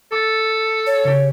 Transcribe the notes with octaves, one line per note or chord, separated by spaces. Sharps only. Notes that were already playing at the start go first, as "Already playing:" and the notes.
A4 D6 A6
C#5
C#3 G4